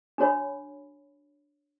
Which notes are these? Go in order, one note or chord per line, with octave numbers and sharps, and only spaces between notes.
D4 F#4 C#5 B5